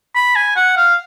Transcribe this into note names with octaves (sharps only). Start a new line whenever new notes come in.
B5
G#5
F#5
F5